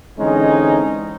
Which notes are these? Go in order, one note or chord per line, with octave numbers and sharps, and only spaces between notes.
D3 E3 G#3 C4 C#4 D#4